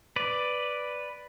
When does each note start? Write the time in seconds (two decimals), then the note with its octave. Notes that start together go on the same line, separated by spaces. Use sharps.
0.16 B4 D5